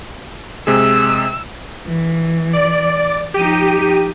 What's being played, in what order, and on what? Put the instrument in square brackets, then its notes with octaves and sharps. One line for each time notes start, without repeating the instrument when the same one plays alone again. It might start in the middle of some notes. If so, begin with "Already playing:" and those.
[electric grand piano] C3 G#3 G#4 [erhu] E6
[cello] E3
[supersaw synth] D5
[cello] F3 D#4 [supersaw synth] G4 D#7